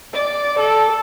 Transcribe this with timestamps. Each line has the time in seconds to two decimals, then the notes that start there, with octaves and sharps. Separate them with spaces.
0.14 D5
0.60 A4